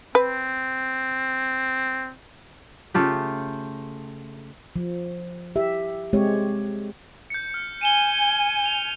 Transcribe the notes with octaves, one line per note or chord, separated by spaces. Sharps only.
C4 B4
C#3 A3 F4 G4
F3
G4 E5
G#3 C4 G4 C#5
G6 C#7
F6
G#5 D#7 E7 G7
F7